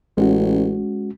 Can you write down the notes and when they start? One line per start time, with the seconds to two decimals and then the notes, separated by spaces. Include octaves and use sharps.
0.17 A1 G#3 C#4 F#4